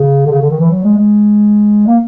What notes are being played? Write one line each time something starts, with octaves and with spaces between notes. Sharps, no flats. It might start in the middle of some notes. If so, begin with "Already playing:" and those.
Already playing: C#3
D3
C#3
D3
D#3
E3
F#3
G#3
G#3
A#3